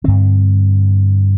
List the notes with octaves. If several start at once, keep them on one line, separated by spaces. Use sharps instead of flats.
G2 D3 C4